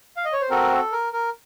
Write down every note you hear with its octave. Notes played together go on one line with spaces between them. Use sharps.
F5
D#5
C#5
C5
C4 F#4 A4 A#4
A4
A#4
A#4